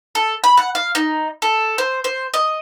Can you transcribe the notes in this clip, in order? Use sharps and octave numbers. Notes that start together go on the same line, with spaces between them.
A4
B5
F#5
F5
D#4
A4
C5
C5
D#5